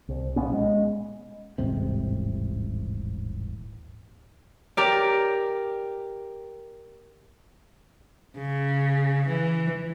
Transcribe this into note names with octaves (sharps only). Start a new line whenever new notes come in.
C2
B1 A#2 B3 C#4
G#3
D#1 A1 G#2 C3
G4 A#4 D5
C#3
E3